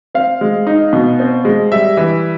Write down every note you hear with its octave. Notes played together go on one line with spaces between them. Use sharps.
C4 F5
G#3
D#4
B2
C4
G#3
G3 E5
E3